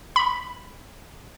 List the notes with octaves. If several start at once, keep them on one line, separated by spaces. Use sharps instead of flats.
B5